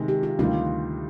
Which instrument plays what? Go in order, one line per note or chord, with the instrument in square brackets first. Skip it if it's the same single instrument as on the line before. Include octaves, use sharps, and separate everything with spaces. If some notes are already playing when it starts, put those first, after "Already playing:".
Already playing: [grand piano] C3 D#3 G#3
[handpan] G4
F4
[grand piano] D2 C3 D#3 G3 [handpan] F4